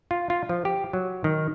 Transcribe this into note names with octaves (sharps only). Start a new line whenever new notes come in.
F4
F4
F3
G4
F#3
D#3